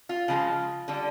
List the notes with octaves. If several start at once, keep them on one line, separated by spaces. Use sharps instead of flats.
F4
C#3 F3 G#3
D3 G3